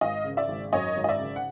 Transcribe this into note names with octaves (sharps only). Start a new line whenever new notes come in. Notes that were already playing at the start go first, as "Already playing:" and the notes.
G#1 D#5 F5
C#3
D5 E5
G#1
F#2 C#5 D#5
G#1
D#5
D5 E5
C#3
F#5